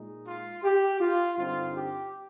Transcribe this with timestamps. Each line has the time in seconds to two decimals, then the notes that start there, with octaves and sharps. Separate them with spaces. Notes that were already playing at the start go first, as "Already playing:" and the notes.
Already playing: A#2 G#3 D#4
0.27 F4
0.64 G4
1.01 F4
1.38 G2 D3 G3 C4 D#4 F4
1.74 G4